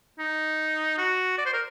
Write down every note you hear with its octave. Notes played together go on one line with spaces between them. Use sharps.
D#4
F#4
D5
C5
A#4